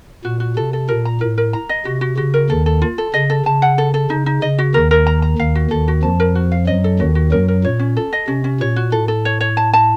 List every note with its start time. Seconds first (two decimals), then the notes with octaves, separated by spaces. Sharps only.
0.24 A#2 F#4
0.40 F#4
0.56 C3 A4
0.73 A4
0.89 A#2 A#4
1.05 A#5
1.21 A2 A#4
1.38 A#4
1.53 A#5
1.69 D#5
1.85 C3 F#4
2.01 F#4
2.17 C#3 F#4
2.34 A#4
2.50 D#2 D#3 A4
2.66 A4
2.82 F4
2.98 A4
3.14 C#3 D#5
3.30 A4
3.46 C#3 A5
3.62 F#5
3.78 A4
3.94 A4
4.10 C#3 D#4
4.26 D#4
4.42 C#3 D#5
4.59 F#4
4.74 D#2 D#3 A#4
4.91 A#4
5.07 A#5
5.22 A#5
5.38 D#2 D#3 F5
5.55 F#4
5.71 D#2 D#3 A4
5.88 F#4
6.03 F2 F3 A5
6.20 A#4
6.35 F#4
6.52 F5
6.67 F#2 F#3 D#5
6.84 A4
6.99 D#2 D#3 F#4
7.15 F#4
7.32 F#2 F#3 A#4
7.48 A#4
7.64 A#2 C#5
7.79 C#4
7.97 A4
8.13 D#5
8.28 C3 C#4
8.44 C#4
8.60 A#2 C#5
8.76 F#4
8.92 A2 A4
9.08 A4
9.25 C#5
9.41 C#5
9.57 A5
9.73 A5